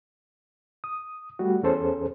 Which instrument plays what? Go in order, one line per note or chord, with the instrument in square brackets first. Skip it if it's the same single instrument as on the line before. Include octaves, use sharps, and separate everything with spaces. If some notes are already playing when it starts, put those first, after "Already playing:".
[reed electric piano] D#6
G3 A3 F#4
E2 C#4 G#4 A4 C5